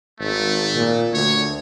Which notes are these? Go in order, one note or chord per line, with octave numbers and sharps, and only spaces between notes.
G#1 A3
A#2
D2 C#5